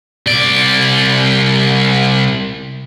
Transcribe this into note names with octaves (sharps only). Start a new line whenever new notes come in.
C2 D5